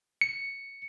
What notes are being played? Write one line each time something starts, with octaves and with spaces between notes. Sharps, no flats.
C#7